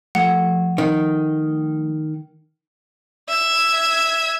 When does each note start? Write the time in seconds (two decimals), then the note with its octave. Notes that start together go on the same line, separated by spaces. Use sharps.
0.15 F3 A3 F#5
0.78 D#3
3.29 E5 G#6